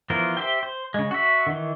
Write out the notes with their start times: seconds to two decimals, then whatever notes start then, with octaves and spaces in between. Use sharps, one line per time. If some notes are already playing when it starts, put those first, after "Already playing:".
0.10 E3 F3 B3 A#4 C5
0.37 G4 C5 E5 G5
0.63 C5
0.94 C#3 G#3
1.11 F#4 E5
1.47 D#3 E3